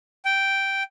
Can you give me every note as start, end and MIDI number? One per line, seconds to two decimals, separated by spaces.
0.25 0.83 79